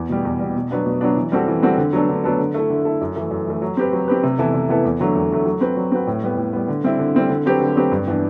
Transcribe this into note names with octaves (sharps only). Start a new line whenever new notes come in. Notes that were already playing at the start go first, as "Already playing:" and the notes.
Already playing: E2
B2 G3
E2
B2 G3
B2
F#3 B3 D4
B2
F#3 B3 D4
E3
G3 C4 F#4 A4
E3
G3 C4 F#4 A4
D3
F#3 B3 D4 A4
D3
F#3 B3 D4 A4
D3
A3 E4 A4
D3
A3 E4 A4
F#2
E3 A3
F#2
E3 A3
F#3
C4 G4 B4
F#3
C4 G4 B4
C3
E3 B3 E4 A4
C3
E3 B3 E4 A4
E2
D3 F#3 A3
E2
D3 F#3 A3
F#3
C4 F#4 B4
F#3
C4 F#4 B4
A2
G3 B3
A2
G3 B3
D3
G3 C4 E4
D3
G3 C4 E4
D3
F#3 C4 G4 B4
D3
F#3 C4 G4 B4
G2
E3 B3 D4